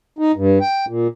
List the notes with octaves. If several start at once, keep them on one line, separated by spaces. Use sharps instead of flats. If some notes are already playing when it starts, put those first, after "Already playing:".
D#4
G2
G5
A#2